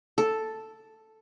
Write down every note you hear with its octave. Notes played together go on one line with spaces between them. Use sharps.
A4